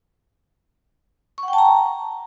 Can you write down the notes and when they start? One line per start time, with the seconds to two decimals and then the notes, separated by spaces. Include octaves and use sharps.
1.38 C#6
1.43 F#5
1.48 G5
1.53 A5
1.58 A#5